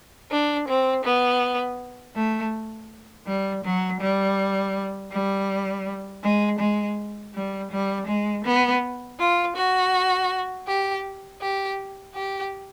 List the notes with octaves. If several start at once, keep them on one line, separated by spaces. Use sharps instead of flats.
D4
C4
B3
A3
G3
F#3
G3
G3
G#3
G#3
G3
G3
G#3
B3
F4
F#4
G4
G4
G4